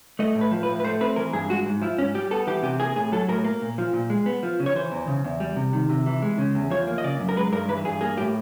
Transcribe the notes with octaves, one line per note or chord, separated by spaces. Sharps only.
A3 D#5
A2
B4
F3
B4
A2
B4
A3 C5
C4 B4
E3 A#4
G2 G#4
G#3 F#4
G#2
F3 E4
G#2 C#4
G3 G4
B3 A4
E3 G4
C3 G4
A#3 G#4
A2 G#4
F#3 A4
A2 A#4
A#3
A#2
F3
A#2
G#3
B3
F3
C#3
C#5
E3 C5
E2
C#3
E2
G3
C3
D#3
C3
E3
G#3
C#3
E2
F3 C#5
A#3
D#5
C#3 D5
F#2
A#4
G#3 B4
G2 A#4
E3 B4
G2 G#4
A#3 G#4
A2 G4